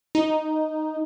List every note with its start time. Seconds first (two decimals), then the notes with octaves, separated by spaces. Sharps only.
0.15 D#4